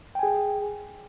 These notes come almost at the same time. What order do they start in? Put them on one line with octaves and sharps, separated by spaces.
G5 G#5 G#4